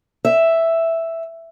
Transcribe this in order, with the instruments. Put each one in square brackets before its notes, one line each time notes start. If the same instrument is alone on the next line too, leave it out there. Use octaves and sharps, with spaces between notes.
[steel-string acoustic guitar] E5